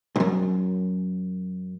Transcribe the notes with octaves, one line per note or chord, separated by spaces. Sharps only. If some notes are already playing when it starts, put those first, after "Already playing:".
B1 F#2